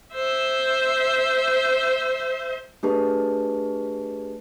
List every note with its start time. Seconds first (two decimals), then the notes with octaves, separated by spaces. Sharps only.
0.14 C5 E5
2.83 A3 D4 G4 G#4 B4 A5